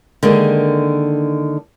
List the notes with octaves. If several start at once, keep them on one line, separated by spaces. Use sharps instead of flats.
D3 D#3 G#3 A#3 C4 D4